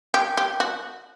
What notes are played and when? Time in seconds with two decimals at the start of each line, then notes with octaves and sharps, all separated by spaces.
0.14 G4
0.37 G4
0.60 F#4